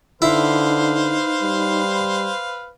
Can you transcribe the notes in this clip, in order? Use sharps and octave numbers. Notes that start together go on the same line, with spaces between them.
D3 D#4 E4 B4 C5 F5
G3